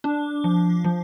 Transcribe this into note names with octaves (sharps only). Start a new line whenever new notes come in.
D4
F3
F3